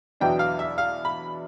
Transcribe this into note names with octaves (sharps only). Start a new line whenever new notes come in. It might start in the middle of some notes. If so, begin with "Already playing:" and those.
E2 B2 F#3 B3 D4 G5
F5
E5
F5
B5